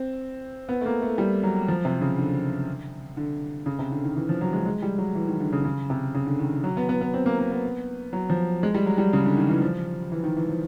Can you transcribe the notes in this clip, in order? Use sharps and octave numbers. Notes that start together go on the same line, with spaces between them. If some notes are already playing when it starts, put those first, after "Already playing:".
Already playing: C4
B3
A3
A#3
A3
G3
F#3
F3
C3
C#3
D3
D3
C#3
C3
D3
D#3
E3
F3
F#3
G#3
G#3
G3
F#3
E3
D#3
D3
C#3
C#3
C3
C#3
D3
D#3
F#3
B3
B3
B3
C4
A#3
A#3
B3
F#3
F3
G#3
G3
F#3
G3
C#3
D3
D#3
E3
F3
E3
D#3
E3
F3